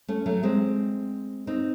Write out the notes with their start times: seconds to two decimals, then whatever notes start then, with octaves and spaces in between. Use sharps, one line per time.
0.08 A3 C#4
0.26 F#3 A3
0.43 G#3 C4
1.47 C4 D#4